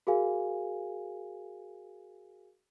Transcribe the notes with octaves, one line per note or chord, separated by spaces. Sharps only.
F#4 G#4 A#4 F5 G#5